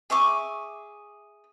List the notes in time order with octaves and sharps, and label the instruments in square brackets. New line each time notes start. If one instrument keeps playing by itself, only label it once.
[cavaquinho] G#4 E5 C#6 D6